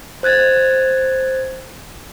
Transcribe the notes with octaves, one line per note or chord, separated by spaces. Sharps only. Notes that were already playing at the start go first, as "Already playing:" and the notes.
C5 F#6 G#6 A6